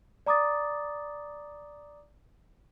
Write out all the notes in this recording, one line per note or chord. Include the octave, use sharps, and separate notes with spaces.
D5 A#5 D6 D#6 A6